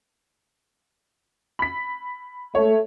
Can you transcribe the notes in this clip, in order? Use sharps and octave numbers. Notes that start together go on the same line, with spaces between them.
B5 B6
A3 C#5